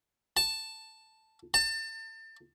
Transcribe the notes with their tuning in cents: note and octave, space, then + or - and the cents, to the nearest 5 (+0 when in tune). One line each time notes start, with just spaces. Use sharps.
A5 +5
A5 +30